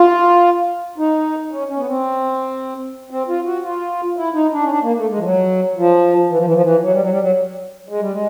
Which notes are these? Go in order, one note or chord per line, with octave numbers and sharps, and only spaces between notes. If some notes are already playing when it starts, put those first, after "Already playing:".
Already playing: F4
D#4
C#4
C#4
B3
C4
C4
F4
F#4
F4
E4
D#4
D4
C#4
D4
A#3
A3
G#3
F3
F#3
F3
E3
F3
E3
F3
E3
F#3
G3
F#3
G3
F#3
G#3
G3
G#3